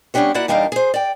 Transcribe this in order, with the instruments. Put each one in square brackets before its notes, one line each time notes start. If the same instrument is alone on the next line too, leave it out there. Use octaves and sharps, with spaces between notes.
[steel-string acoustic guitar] G3 B3 C#4 D4 G4 C#5
A#3 E4 F#4 D5 F#5
E2 G3 D4 D#4 A#4 F5
G#4 C5
D5 G5